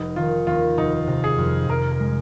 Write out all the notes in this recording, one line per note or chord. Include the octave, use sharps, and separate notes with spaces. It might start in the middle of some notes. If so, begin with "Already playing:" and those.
Already playing: F1 D#4
D#3 F4
D#2 F4
F1 D#4
C3
G#4
F2
F2 A#4
A#4
G#3